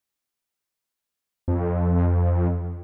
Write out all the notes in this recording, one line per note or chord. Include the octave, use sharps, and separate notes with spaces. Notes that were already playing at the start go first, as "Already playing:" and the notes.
F2